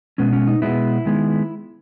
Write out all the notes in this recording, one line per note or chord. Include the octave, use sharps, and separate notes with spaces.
B2 G#3 B3 C#4
C#4
D#4
B2 G#3 B3 E4
D#3 G#3 B3